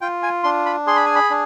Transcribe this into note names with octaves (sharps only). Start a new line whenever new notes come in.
F4 G5
G#5
D4 C6
B5
G#4 C6
B5
G#5
B5
D4